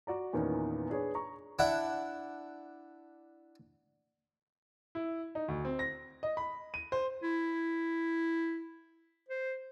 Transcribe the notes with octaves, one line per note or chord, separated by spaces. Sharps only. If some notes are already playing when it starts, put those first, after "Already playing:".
F#4 D5 A#5
E2 A#2 D#3 B3 C#4 D#4
D4 G#4 B4 C#5
A#5 C#6
D4 E4 F#5
E4
D#4
D2
C4
A#6
D#5
B5
D#7
C5
E4
C5